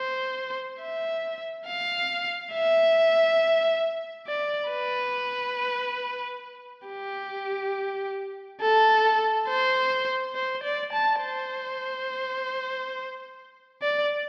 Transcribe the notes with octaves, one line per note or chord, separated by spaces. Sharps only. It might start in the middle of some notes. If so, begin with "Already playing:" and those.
Already playing: C5
E5
F5
E5
D5
B4
G4
A4
C5
C5
D5
A5
C5
D5